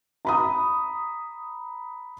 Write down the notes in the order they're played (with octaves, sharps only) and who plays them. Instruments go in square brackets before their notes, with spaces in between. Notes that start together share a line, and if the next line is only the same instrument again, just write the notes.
[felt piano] A#5 B5 D#6